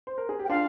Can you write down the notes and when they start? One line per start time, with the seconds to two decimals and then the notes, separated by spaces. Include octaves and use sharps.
0.07 C5
0.18 A#4
0.29 G#4
0.39 G4
0.44 G5
0.49 D4 F4 F5